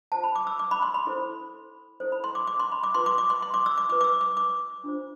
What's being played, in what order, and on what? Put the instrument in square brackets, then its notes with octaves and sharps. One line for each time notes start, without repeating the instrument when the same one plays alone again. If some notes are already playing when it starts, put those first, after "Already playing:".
[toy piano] F4 C5 A5
B5
D6
E6
D6
B5
C6
B5
E4 A4 C5
E4 A4 C5
B5
C6
D6
D6
C6
B5
D6
F4 B4 C6
D6
D6
C6
C6
D6
E6
D6
F4 D6
B4
D6
E6
D6
D6
D4 F4 C5